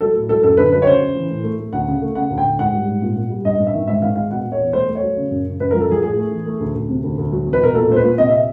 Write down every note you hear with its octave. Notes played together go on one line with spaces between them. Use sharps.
F#3 A4
A2
F#3 A4
F#2 A4
D3 B4
F#3 B4
C#5
C#3 C5
C#3
E3
A2
A3
A3
D2 F#5
C#3
A3
C#3 F#5
D2
G5
D2
G#2 F#5
G3
G#2
A#2
A#2
G3
G2 D#5
G2
E5
D#3
G#2 E5
D#3 F5
G#3 F5
B2 F#5
B2
C#5
E2
A3 C5
A3
C#5
F#3
C#3
F#2
C#3
F#2 B4
A#4
F3
A4
F3 G#4
A2 G#4
A3
E3
A3
D2
D2
C3
D2
D2
F#3
E2
B4
B2 A#4
A#2 A4
A#2 C5
B4
A#2
C3 D#5
E5